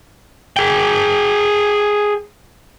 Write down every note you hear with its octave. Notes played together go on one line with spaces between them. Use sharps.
G#4 G5